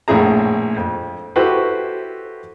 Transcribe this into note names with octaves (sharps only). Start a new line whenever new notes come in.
A#1 A2 E4 G#4 A#5
F2
E4 F#4 G4 A4 B4 C5